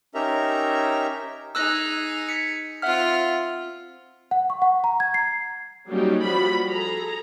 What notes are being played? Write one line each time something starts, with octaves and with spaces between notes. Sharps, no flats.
C#4 D#4 G4 A#4 E5 A#5
D#4 G#4 E6 F#6 A#6
B6 C#7
C4 F4 E5 F#5 F6
F#5
C#6
F#5
A#5
G#6
C7
F#3 G3 A#3 C#4 D#4 G4
F3 G3 A#3 F#4 B5
G#4 A4 A#5